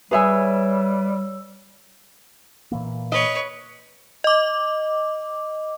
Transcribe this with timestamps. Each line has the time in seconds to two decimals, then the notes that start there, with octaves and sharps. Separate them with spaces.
0.11 G3 G#4 B4 C#5 E5 G#5 E6
2.72 A#2 E3 A#3
3.12 B4 C#5 D#5
4.24 D#5 D6